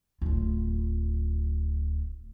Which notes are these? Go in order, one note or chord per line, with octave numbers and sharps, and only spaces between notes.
D1 F4